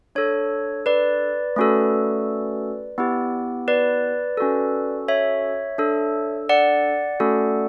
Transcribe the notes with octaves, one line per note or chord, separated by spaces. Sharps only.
D4 A4 C#5
B4 D5
A3 C#4 F#4 A4
B3 E4 G4
B4 D5
C#4 F#4 A4
C#5 E5
D4 A4
D5 F#5
A3 C#4 F#4 A4